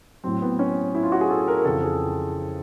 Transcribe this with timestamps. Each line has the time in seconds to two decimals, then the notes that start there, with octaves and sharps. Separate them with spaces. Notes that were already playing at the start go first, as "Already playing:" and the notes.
0.24 A2 F#3 C4
0.42 B3
0.59 C#4
0.95 E4
1.03 F4
1.12 F#4
1.21 G#4
1.30 A4
1.48 A#4
1.65 F2 C#3 E3 A4
1.83 G#4